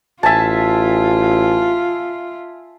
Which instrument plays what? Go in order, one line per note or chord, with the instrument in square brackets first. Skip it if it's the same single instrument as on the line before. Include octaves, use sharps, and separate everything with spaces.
[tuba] A1 [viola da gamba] F4 [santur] E5 G#5 A5